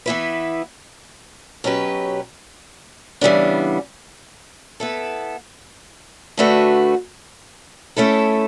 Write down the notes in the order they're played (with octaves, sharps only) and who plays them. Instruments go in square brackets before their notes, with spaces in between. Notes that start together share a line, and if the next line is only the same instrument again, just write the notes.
[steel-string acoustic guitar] E3 B3 E4 B4
B2 F#3 C#4 G4 B4
C#3 E3 G3 B3 D4
B3 E4 A4
D3 A3 D4 F#4 B4
A3 C#4 E4 A4